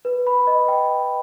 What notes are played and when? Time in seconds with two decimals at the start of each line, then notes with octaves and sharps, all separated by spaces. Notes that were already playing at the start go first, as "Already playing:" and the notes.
0.05 B4
0.27 B5
0.47 D#5
0.68 G5